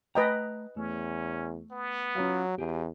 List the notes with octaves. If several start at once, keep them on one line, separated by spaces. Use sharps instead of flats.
A3 B4 D#5 G5 A#5
E2 A3 C#4
B3
F#3 C#4 F4 F5
E2 G4 G#4